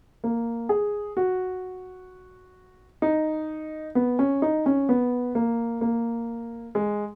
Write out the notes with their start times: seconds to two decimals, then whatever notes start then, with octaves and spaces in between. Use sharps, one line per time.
0.24 A#3
0.69 G#4
1.17 F#4
3.02 D#4
3.95 B3
4.19 C#4
4.42 D#4
4.66 C#4
4.89 B3
5.35 A#3
5.81 A#3
6.75 G#3